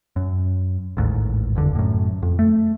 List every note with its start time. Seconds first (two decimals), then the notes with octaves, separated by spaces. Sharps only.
0.16 F#2
0.97 A1 D#2 G#2
1.55 F1 C#2 D3
1.75 F#2 A2
2.23 F2
2.39 A3